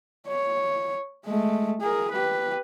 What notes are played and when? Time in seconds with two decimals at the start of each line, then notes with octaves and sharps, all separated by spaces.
0.28 C#5
1.26 G#3 A3
1.81 G#4 A#4
2.11 G4 B4